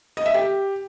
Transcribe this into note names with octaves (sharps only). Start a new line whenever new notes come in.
D#5
E5
G4